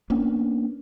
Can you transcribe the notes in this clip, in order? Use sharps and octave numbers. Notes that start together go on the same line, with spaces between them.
A#3 B3 C#4 D4